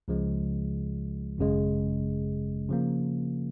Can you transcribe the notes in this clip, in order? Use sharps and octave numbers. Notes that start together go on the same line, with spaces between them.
C#2 C#3 F3 G#3
G#1 F#2 C#3 G#3
C#3 F3 A#3